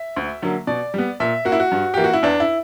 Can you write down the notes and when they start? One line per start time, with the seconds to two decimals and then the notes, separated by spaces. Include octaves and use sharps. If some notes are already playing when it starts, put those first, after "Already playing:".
Already playing: E5
0.16 D2
0.42 D3 F#3 A#3
0.67 B2 D5
0.94 G3 B3
1.20 A#2 E5
1.45 A#3 F#4
1.52 E4
1.60 F#4
1.71 G2
1.94 E3 A#3 G4
2.04 F#4
2.13 E4
2.23 E2 D4
2.40 E4